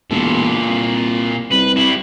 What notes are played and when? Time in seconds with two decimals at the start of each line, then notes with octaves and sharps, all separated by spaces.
0.11 E1 A#2 A4
0.68 C2
1.52 C2 B4
1.77 G3 E4